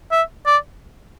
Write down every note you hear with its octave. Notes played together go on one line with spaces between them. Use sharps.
E5
D5